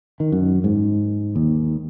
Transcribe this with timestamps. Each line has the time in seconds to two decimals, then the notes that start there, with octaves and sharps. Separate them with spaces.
0.20 D#3
0.32 F#2
0.64 G#2
1.36 D#2